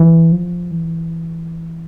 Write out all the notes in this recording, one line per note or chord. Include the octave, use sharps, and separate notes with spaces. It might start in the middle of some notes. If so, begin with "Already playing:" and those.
Already playing: E3
F3
E3